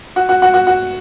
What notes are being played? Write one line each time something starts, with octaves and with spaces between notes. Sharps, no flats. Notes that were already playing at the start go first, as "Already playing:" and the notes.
F#4
F#4
F#4
F#4
F#4